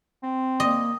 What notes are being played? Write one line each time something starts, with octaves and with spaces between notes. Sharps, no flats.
C4
A#3 D#5